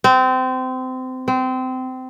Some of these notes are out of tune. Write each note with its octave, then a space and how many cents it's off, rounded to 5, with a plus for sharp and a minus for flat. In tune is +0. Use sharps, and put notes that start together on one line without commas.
C4 -25
C4 -25